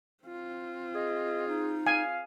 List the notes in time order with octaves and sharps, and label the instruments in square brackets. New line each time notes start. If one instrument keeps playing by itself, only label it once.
[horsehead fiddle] C4 F4
[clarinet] G#4 [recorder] D#5
[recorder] D#4
[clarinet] F5 [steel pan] G#5